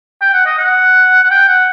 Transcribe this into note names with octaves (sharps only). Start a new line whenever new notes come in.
G5
F#5
D#5
F#5
F#5
G5
F#5